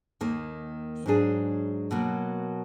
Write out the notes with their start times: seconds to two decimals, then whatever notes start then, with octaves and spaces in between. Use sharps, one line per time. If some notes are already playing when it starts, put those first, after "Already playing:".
0.21 D#2 D#3 A#3
1.06 G#2 F#3 D4 G#4
1.91 B2 F#3 A#3